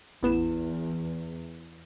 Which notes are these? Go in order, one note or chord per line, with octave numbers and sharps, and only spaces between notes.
A1 E2 B3 E4 E7